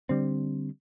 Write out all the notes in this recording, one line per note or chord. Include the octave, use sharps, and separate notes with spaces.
D3 G3 C4